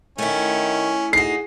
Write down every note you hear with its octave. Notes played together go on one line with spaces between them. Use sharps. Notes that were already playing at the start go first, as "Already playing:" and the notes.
D#3 A3 C#4 E4
D#4 F#4 G#4 C7